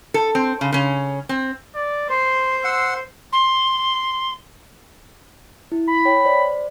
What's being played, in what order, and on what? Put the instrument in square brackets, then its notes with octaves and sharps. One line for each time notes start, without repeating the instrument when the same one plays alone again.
[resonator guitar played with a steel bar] A4
C4
C#3
C#3 C#4
C4
[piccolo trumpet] D5
[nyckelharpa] C5 [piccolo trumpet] C6
[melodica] F#5 C6 [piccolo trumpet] E6
[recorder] C6
[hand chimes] E4
[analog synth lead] B5
[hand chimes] C#5 G5
C5 D5